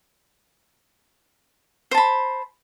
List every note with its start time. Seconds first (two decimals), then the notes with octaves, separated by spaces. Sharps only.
1.91 C5
1.94 A5
1.98 B5